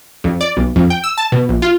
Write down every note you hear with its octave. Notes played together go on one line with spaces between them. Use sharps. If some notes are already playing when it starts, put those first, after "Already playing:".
F2
D5
B1
F2
G5
E6
A5
B2
A#1
F4